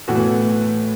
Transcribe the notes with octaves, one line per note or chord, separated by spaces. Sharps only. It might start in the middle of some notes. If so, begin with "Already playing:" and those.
A2 E3 B3 F#4